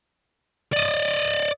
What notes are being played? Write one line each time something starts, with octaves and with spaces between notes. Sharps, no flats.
D5 D#5